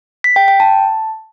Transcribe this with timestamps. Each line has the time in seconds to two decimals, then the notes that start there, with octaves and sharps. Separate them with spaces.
0.24 B6
0.36 G5
0.48 G5
0.60 A5